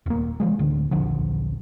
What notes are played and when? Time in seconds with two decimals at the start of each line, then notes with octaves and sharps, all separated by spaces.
0.06 D#1 A#3
0.40 E3 F3 G#3
0.59 D1 D3
0.91 D#1 A#1 D3 F3